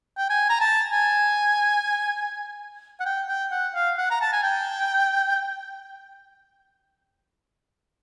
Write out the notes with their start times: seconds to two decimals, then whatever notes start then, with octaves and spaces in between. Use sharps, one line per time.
0.17 G5
0.30 G#5
0.50 A#5
0.61 A5
0.91 G#5
3.00 F#5
3.06 G5
3.29 G5
3.51 F#5
3.74 F5
3.98 F#5
4.11 A#5
4.21 A5
4.33 G#5
4.43 G5